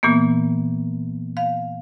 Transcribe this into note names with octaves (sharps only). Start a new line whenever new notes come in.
A#2 E3 A#3 B3
F5